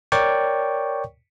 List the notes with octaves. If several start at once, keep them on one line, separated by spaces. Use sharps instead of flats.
A#4 C#5 D5 G5 C#6